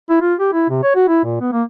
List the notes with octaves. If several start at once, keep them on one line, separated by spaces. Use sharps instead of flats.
E4
F4
G4
E4
C3
C#5
F#4
E4
A#2
B3
A#3